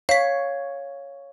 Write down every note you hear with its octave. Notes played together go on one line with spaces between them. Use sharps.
C#5 F5 B6